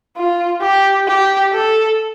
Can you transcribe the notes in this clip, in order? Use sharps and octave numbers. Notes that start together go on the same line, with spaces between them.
F4
G4
G4
A4